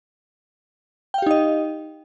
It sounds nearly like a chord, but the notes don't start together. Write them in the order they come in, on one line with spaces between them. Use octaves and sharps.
G5 F5 G4 D#4 D#5